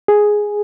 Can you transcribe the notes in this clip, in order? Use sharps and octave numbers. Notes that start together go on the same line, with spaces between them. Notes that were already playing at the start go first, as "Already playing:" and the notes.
G#4